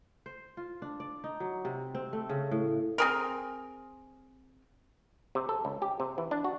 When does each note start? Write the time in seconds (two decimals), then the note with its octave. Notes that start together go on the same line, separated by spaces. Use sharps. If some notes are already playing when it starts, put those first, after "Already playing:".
0.26 C5
0.57 F4
0.82 D4
1.00 D5
1.24 D#4
1.40 F#3
1.65 C3
1.95 C4
2.13 A3
2.29 C#3
2.51 A2
2.98 C4 G#4 A#4
5.35 C3
5.49 A4
5.65 C#2
5.82 G4
6.00 C3
6.18 E3
6.31 D4
6.44 F#4